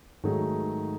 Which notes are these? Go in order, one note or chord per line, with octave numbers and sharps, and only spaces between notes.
G#2 D#3 F#3 A3 D#4 G#4